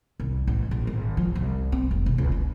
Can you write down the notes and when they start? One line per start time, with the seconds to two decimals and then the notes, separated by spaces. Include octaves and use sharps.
0.20 C2
0.47 A1
0.71 A#1
0.87 G#1
1.17 F3
1.35 C2
1.72 C4
1.91 F1
2.06 B1
2.18 C#2
2.32 D4